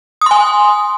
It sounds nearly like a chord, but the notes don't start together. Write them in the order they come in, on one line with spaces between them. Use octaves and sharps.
D#6 C6 G#5